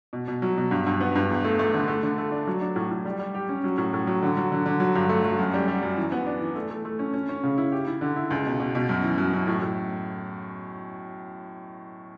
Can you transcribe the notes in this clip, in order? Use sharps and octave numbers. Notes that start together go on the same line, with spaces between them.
B2
B2
F#3
B2
G2
G2
B3
G2
E2
A3
A3
D3
A3
D3
A3
D4
F#3
D4
A2
A2
G3
G3
G4
C#4
F#3
A2
A2
F#3
D3
F#3
D3
D3
F#3
G2
A3
F#3
F#2
G3
G3
F#2
E3
B3
D4
E3
A3
A3
A3
C#4
C#4
C#4
C#3
E4
G4
E4
D3
E4
C#2
B2
B2
B2
F#2
E3
F#2
F#2
A2
A2